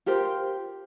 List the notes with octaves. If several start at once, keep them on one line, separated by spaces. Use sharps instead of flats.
F4 G4 A#4 C5